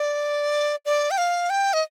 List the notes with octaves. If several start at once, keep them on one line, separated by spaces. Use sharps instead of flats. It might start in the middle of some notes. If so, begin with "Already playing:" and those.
Already playing: D5
D5
G5
F5
G5
D#5